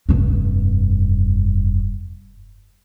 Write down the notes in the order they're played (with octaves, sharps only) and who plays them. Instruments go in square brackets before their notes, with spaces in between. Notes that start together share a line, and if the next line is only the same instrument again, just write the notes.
[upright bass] F1 G2